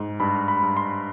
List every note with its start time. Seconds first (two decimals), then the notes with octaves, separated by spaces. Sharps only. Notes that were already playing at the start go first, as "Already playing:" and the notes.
Already playing: G#2
0.20 G2 B5
0.48 B5
0.62 G2
0.77 C6